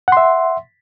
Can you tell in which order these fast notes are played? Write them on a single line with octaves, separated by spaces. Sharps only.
F#5 C6 E5